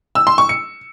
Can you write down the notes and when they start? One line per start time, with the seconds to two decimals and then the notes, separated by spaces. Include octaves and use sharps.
0.15 E6
0.27 C6
0.38 C#6
0.49 C#7